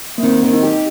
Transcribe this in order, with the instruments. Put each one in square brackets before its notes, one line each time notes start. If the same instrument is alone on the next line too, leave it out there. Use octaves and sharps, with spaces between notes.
[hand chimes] A#3
[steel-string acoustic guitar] D#3 [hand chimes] C4
[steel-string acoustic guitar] D#3
[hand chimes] D#4
[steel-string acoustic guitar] G4